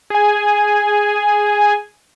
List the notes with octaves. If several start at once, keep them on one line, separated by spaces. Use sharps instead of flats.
G#4 G#5